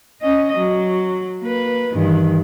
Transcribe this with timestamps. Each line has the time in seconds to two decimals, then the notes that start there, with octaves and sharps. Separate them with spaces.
0.22 C#4 D#5
0.57 F#3
1.42 A#3 B4
1.93 G2 D#3 E3